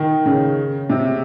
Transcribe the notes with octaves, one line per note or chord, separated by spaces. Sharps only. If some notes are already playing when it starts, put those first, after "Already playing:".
Already playing: D#3
C#3
C3